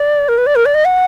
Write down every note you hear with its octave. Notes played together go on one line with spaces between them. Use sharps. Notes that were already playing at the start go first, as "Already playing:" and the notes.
Already playing: D5
A#4
B4
D5
A#4
D5
D#5
F#5